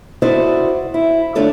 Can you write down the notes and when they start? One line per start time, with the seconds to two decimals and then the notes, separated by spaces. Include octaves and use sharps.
0.22 E4 F#4 A4 C5 D5 D#5
0.94 E4
1.35 D3 A3 D4 F4 A4 C#5